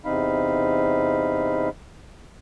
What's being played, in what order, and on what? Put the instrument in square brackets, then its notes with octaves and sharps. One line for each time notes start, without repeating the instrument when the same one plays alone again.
[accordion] E2 C3 C4 D#4 F5 B5